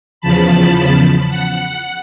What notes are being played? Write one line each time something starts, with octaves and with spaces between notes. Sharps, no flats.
E2 C#3 F3 A5 B5
F#5